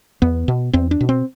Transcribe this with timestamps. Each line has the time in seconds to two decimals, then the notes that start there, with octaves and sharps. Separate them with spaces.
0.22 E2 B3
0.48 B2
0.73 E2 C4
0.91 D4
1.01 B2
1.09 C4